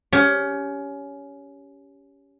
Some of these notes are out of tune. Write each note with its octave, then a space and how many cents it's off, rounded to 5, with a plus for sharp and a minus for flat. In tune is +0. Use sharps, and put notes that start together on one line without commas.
C#4 +20 G4 +0